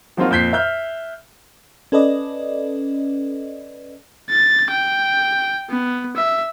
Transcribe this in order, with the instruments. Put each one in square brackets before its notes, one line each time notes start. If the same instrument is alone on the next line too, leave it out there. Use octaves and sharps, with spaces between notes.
[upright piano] F3 F#3 A#3 C4 D#4 F4
F2 A#2 G6 B6 C7
E5 F6 G6
[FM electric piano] C#4 A4 B4 D5 D#5
[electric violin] A6
G5
B3
E5